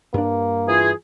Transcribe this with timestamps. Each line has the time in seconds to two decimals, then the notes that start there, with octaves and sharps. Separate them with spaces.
0.14 G2 A#3 D4
0.67 E3 F4 G#4